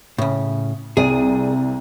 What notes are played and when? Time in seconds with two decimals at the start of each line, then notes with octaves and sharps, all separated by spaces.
0.18 A2 C#3
0.97 C2 G#4 D5 D#7